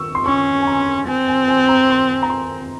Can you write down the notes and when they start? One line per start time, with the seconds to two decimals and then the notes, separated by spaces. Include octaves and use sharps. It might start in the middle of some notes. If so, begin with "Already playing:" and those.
Already playing: C#6 E6
0.15 C6
0.26 C#4 C#6
0.61 G#5
0.67 A#5
1.07 C4 G#5
1.28 G#5
1.48 G#5
1.69 A#5
1.89 C6
2.23 A#5
2.30 C6